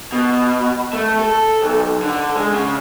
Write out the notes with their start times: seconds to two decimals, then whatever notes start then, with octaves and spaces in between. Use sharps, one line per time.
0.12 B2
0.93 A3
1.19 A4
1.62 B1
2.03 D3
2.35 G#3
2.53 C#3